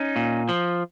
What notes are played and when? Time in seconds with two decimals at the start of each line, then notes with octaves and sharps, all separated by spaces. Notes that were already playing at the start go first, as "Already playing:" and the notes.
Already playing: C#4 D#4
0.16 A#2
0.49 F3